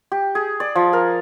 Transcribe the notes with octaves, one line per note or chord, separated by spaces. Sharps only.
G4
G#4
D5
F3
A#4